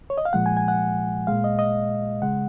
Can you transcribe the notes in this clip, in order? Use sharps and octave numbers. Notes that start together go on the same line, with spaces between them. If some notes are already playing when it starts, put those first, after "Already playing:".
C#5
D#5
F5
A#2 F3 G#3 F#5
G#5
G#5
F#5
A#2 G#3 F5
D#5
D#5
C#3 G#3 F#5